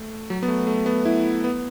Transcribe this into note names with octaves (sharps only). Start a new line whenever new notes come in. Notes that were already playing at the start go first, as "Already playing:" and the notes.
Already playing: A3
F#3
B3
A3
A3
B3
E4
B3